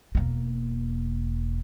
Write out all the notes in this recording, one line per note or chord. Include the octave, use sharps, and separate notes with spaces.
E1 A#3